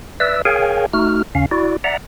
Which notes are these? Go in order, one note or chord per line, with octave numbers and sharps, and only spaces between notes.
B4 D5 E5 E6
G#4 A#4 C#5 F5 G5 G#5
A3 D#4 F#4 F6
D#2 C#3 C#4 F5
E4 F#4 D5
D5 E5 F#5 A#5